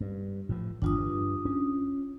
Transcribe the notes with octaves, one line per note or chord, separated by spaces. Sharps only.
G2
A2 F3
G1 E2 D4 F4 D#6
G2
C#4